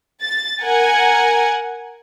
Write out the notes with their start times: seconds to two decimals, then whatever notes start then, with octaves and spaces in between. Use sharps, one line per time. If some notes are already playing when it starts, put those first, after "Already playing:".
0.23 A6
0.64 A#4 F#5 G#5